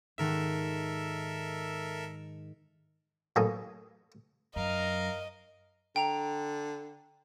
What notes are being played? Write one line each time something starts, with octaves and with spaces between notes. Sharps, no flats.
G#2 D#3 A4 A#4 E5 F#6
A1 F#2 B2 A#3 A4 D#6
F#2 A#4 D#5 F5
D3 G5 A#5 F7